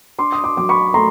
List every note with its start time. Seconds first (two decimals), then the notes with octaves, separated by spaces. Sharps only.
0.19 D4 C6 D6
0.32 D#6
0.44 C6 D6
0.57 F#3 D6
0.69 B5 C#6
0.94 A3 A#5 C6